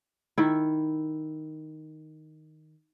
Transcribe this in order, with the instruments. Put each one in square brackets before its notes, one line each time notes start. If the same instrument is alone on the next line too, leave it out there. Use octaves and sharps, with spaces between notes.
[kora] D#3 E4